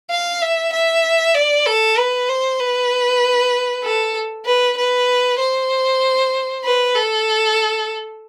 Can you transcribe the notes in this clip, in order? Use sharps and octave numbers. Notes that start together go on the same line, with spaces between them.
F5
E5
E5
D5
A4
B4
C5
B4
A4
B4
B4
C5
B4
A4